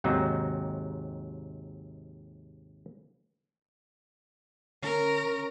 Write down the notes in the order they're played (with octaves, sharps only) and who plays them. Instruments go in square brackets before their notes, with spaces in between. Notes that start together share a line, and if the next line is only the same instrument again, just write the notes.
[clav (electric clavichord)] D#2 G#2 C3 F#3 C4 D#4
[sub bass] D3 [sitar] C#4 [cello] A#4